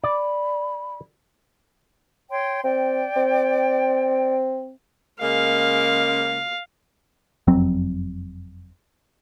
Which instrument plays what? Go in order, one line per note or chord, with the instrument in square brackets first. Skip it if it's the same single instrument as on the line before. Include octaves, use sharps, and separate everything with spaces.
[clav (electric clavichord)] D5 [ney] B5
[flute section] C#5 G5 C6
[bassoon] C4 [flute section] D5 G5
[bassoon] C4
[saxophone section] C#3 G#3 A#3 [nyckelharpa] F5
[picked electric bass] F#1 F2 F#3 C4